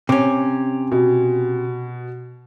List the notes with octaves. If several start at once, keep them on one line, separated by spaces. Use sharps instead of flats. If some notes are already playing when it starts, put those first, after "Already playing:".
C3 C#4 D6
B2